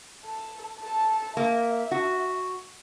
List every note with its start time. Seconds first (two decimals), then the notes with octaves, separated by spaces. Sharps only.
0.25 A4
0.80 A4 A5
1.37 A#3 E5
1.91 F#4